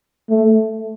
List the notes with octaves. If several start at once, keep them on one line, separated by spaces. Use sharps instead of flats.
A3